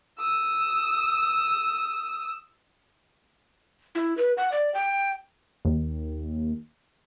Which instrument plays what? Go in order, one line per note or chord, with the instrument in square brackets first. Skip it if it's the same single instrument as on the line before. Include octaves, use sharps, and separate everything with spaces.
[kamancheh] D#6 E6
[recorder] E4
B4
F#5
D5
G5
[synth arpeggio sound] D#2